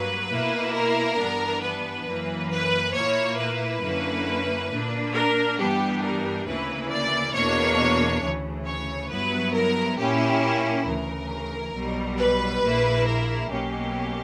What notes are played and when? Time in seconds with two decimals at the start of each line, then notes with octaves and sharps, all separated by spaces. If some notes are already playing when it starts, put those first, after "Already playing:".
Already playing: G2 F#3 A#3 B4
0.30 B2 A#3 E4
0.74 A#4
1.18 G2 E3 B3 D4
1.61 B4
2.06 F#2 E3 A#3
2.50 B4
2.94 A#2 A#3 E4 C#5
3.37 B4
3.82 F#2 D3 A#3 C#4 E4
4.70 A#2 A#3 D4
5.14 A#4
5.58 G2 E3 G3 B3 D4 G4
6.02 A#4
6.46 D2 C#3 E3 A#3 E4 B4
6.90 D5
7.34 E2 B2 A#3 D4 C#5
8.22 D2 C#3 E3
8.66 C#5
9.10 G2 F#3 B3 E4 B4
9.54 A#4
9.98 A#2 A#3 C#4 E4 G4
10.42 G4
10.86 D2 C#3 E3 A#4
11.74 B1 B2 G3
12.18 B4
12.62 A#1 A#2 A#3 E4
13.06 A#4
13.50 B1 B2 F#3 A#3 C#4 G4